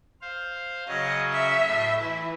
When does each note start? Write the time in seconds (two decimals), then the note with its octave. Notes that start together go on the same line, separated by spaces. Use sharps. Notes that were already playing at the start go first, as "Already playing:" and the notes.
0.21 C5 F5
0.88 C#3 F#3 C#4 D#5
1.32 E5
1.67 A2 C6
2.00 E3 E4